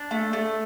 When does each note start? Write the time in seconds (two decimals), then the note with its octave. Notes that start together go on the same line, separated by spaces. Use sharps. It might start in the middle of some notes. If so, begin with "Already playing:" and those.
Already playing: D4
0.11 A3
0.33 A3